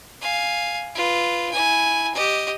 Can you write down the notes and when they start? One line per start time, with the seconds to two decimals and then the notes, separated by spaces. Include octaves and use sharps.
0.21 F5 G#5
0.95 F4 B4
1.51 E4 G#5
2.14 G4 D#5